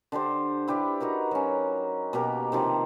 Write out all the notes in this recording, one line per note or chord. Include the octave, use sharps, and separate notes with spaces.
D3 D4 G4 C5
E4 G4 B4 D5
D#4 F#4 A#4 B4
F#3 C#4
B2 A#3 G4 A#4
C3 D#3 F3